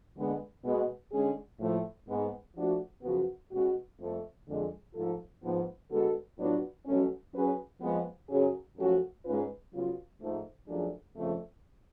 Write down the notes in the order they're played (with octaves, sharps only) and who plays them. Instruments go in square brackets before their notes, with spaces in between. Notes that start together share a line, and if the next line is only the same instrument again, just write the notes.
[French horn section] D3 G#3 B3
B2 G#3 B3
D3 G#3 C#4 G#4
A2 F3 A3
G#2 G#3 B3
F3 A3 D4 F#4
F#2 C#3 F3 B3 F#4
B2 G#3 C#4 F#4
F2 F3 A3
F2 D3 G#3
G#2 F3 A3 F4 A4
G#2 F3 B3
D3 G#3 B3 F#4 A4
A2 F#3 B3 D4 F4
B2 F#3 A3 C#4
F#3 C#4 G#4 B4
F2 F3 G#3 B3
F#2 C#3 F#3 C#4 G#4
F#2 F3 A3 C#4 F#4
G#2 G#3 C#4 F4 B4
C#3 F#3 B3 F4
G#2 F3 A3
F#2 F3 A3 D4 G#4
F2 C#3 F3 A3